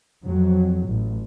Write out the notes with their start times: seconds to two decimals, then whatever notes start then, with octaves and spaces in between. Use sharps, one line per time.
0.24 F2 F#3
0.87 A1